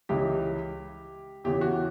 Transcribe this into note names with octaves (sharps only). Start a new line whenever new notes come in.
C#2 C#3 E3 G4
E2 C#3 E3 G4
F#4